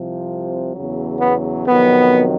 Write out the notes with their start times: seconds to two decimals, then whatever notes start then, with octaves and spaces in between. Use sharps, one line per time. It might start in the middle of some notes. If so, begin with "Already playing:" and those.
Already playing: C2 C3 F3
0.74 E2 C#3 F#3
1.20 B3
1.68 F2 C3 D#3 F#3 B3